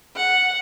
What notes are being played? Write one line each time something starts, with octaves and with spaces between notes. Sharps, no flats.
F#5